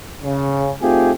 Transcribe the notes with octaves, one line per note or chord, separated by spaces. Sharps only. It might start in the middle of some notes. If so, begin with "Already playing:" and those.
C#3
A3 C4 D#4 F4 G4 G#4